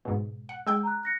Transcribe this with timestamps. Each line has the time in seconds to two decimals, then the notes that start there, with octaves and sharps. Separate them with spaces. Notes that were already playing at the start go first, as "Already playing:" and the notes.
0.05 G#2 B2
0.49 F#5
0.67 G#3 G5 E6 G6
0.83 A#5 F#6
1.03 F#6 A#6 C#7